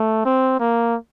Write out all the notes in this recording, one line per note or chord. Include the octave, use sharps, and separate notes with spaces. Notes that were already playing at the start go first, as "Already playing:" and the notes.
Already playing: A3
C4
A#3